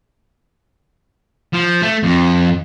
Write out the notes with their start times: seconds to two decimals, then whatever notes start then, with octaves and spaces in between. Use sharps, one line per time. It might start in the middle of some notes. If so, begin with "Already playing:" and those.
1.53 F3
1.82 A3
2.04 F2